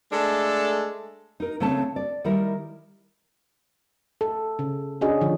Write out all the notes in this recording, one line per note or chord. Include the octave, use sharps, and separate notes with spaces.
G#3 A3 D4 A4
D#4 A#4
C#3 A3 C4 C#5 A5
D5
D#3 G3 E4 A#4
A4
C#3
C#4 D4 F#4 G#4 D#5
D3 F3